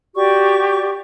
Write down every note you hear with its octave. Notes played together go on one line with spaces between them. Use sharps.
F#4 G4 D5 C#6